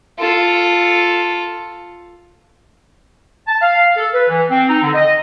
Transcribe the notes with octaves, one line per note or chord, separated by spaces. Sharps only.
F4 A4
A5
F5
A4
B4
E3
C4
D#4
D3
D#5